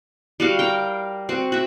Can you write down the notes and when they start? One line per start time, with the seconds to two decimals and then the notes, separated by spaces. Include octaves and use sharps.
0.40 G3 F#4 F5
0.59 A#4 G5
1.29 C4 F#4
1.52 F#4 E5